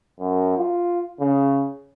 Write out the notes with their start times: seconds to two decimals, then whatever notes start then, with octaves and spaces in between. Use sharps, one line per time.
0.20 F#2
0.58 F4
1.20 C#3